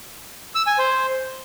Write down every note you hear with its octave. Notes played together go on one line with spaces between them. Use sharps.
E6
G#5
C5